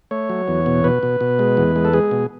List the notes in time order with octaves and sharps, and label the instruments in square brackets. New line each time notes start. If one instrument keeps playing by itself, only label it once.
[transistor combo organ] A3 C#5
F#3
E2
B2
B2 B4
B2
B2
G#3
E2
G#3
A4
G#3 G#4
B2